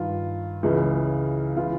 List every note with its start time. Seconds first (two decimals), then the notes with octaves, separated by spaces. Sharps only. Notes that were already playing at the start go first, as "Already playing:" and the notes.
Already playing: G2 D#3 F4
0.63 C#2 C#3 E3
1.56 C#3 E3 F4